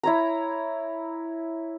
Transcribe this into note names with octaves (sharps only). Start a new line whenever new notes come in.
E4 C#5 A#5